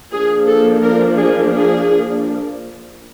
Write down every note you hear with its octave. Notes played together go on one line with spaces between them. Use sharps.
F3 A#3 D4 G#4
A4
A#4
G#4
G#4